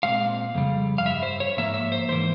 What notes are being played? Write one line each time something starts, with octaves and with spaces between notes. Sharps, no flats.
A#2 G#3 C4 F5
F2 C#3 G3
F5
G2 G3 E5
C5
C#5
G#2 F3 A#3 E5
E5
C5
G#2 E3 A#3 C5